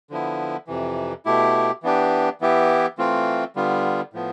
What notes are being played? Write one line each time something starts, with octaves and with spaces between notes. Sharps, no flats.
D3 F3 B3 E4
F2 C3 E3
B2 A3 E4 G4
E3 B3 D4 G4
E3 B3 E4 G4
E3 A3 C4 F4
D3 G3 B3 F4
A2 F3 B3